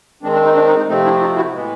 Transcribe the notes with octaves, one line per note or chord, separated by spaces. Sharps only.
D#3 G#3 C4 D4
D4
D#4
D4
D#4
D#4
C3 F3 A3 C4 D#4
D4 E4
D#4 F4
E4 F#4
A2 E3 G#3 B3